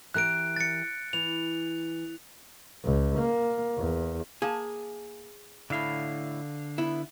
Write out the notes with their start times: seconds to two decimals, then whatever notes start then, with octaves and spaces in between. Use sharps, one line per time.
0.14 E3 G4 A#4 F#6 D7
0.56 A6 C#7
1.13 E3 F7
2.85 C#2
3.19 A#3
3.78 E2
4.42 A#3 G#4 A5
5.70 A2 D3 E4 F5
6.78 B3 E4